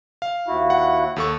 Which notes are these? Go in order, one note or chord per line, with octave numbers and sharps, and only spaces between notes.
F5
D#2 E4 F#4
F#5
D#2 A4 C#6